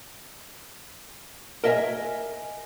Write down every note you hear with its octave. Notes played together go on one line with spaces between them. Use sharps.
A#4 D#5 E5 G#5